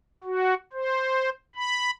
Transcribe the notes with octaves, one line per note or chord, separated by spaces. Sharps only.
F#4
C5
B5